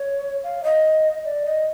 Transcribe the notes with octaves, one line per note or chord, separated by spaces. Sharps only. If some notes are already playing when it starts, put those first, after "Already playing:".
Already playing: C#5
F5
D#5
D5
D#5